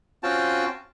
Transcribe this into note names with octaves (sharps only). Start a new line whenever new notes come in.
C4 C#4 F4 F#4 G5 A5